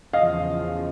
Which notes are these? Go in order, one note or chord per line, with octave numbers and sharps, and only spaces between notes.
E2 C#3 F3 D#5 F5